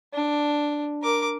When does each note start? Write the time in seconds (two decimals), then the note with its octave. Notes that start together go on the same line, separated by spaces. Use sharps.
0.13 D4
1.02 A#4 D6